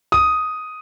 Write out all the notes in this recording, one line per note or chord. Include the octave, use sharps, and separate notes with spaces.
D#6